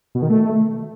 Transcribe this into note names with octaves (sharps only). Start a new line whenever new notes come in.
B2
D#3
A3